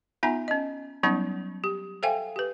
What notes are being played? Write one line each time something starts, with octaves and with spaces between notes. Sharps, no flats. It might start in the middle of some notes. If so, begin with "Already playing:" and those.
B3 D#4 F4 E5 G#5 A#5
C#4 D#5
F#3 G3 B3 C#4 D#4
G4
A4 C5 E5 F5 G5 G#5
G4 B4